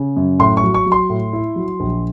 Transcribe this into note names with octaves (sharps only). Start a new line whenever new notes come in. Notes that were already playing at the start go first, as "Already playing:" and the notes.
Already playing: C#3
F#2
A2 C6
C#6
F#3
C#6
F#3
C6
A2
E4
F#3
A#1